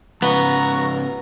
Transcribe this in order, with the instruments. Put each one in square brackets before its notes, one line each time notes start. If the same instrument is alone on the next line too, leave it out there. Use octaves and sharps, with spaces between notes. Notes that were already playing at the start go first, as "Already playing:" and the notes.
[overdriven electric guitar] G#2 C#3 [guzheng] B3 [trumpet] A#5 [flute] C#6